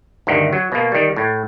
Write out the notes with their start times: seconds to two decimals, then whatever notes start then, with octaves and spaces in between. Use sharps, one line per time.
0.27 D2 G2 D#3
0.53 F#3
0.72 B2 A#3
0.92 D#3 G3
1.16 A2